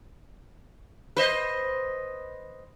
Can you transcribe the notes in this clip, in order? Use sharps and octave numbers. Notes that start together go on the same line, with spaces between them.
B4 C5 D#5